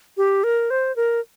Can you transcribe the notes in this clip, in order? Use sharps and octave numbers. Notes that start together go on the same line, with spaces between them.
G4
A#4
C5
A#4